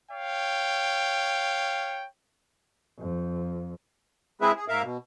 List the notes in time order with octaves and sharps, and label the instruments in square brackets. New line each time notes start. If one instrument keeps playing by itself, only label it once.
[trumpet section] C#5 F5 G5
[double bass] F2
[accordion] G#3 C4 E4 G#4 B4 E5
G#4
G#2 A#3 A#4 E5 F5
B2